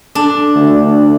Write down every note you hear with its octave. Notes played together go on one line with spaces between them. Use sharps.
D4
D2